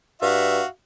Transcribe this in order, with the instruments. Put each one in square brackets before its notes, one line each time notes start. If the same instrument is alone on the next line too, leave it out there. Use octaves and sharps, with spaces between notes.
[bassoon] G2 [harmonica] F#4 E5 F5